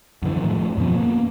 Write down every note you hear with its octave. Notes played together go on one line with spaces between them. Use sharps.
F#2 D3 E3
A2 D#3 F3
F#2 B2 F3 C#4
A#3 B3